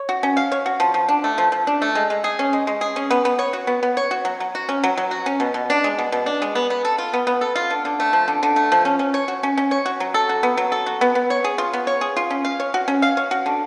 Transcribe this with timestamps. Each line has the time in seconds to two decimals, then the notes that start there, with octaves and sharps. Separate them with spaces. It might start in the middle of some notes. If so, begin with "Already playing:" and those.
Already playing: C#5
0.09 F#4
0.23 C#4
0.37 F5
0.52 C#5
0.66 F#4
0.80 F3
0.94 F3
1.09 D4
1.24 A3
1.38 F3
1.52 F3
1.67 D4
1.82 A3
1.95 G#3
2.10 G#3
2.24 G#4
2.39 C#4
2.53 G#3
2.67 G#3
2.81 G#4
2.96 C#4
3.11 B3
3.25 B3
3.39 C#5
3.53 F#4
3.67 B3
3.83 B3
3.97 C#5
4.11 F#4
4.25 F#3
4.40 F#3
4.55 F#4
4.69 C#4
4.84 F#3
4.98 F#3
5.11 F#4
5.26 C#4
5.40 B2
5.54 B2
5.70 D4
5.84 G#3
5.99 B2
6.12 B2
6.26 D4
6.42 G#3
6.55 B3
6.70 B3
6.85 A4
6.98 F4
7.13 B3
7.27 B3
7.41 A4
7.55 F4
7.70 D3
7.85 D3
8.00 A3
8.13 F3
8.28 D3
8.43 D3
8.56 A3
8.72 F3
8.85 C#4
8.99 C#4
9.14 C#5
9.28 F#4
9.43 C#4
9.57 C#4
9.71 C#5
9.86 F#4
10.00 F#3
10.14 A4
10.29 F#4
10.43 B3
10.57 F#3
10.72 A4
10.86 F#4
11.01 B3
11.15 B3
11.30 C#5
11.44 G#4
11.58 F4
11.73 B3
11.87 C#5
12.01 G#4
12.16 F4
12.30 C#4
12.45 F5
12.60 C#5
12.74 F#4
12.88 C#4
13.02 F5
13.17 C#5
13.31 F#4
13.46 D3